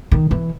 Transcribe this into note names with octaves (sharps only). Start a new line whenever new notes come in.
D#3
E3